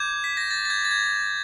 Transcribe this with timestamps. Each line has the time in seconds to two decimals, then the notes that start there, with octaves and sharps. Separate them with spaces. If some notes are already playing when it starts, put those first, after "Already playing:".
Already playing: D6 G6 G#6
0.24 B6
0.37 A#6
0.51 A6
0.65 A6
0.70 G#6
0.85 A6
0.91 G#6